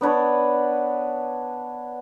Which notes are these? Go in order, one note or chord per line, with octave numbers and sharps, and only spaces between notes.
B3 D4 B4 C#5